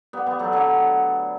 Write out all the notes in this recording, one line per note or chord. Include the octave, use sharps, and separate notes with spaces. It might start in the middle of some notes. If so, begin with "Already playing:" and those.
G3 B3
G3 B3
F#3 A3
D3 F#3